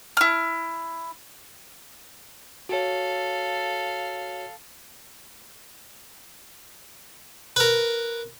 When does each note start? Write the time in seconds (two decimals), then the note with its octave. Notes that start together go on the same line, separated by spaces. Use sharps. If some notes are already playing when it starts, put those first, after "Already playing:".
0.17 E4 F6
2.69 F#4 A4 C#5 F5
7.56 A#4 B4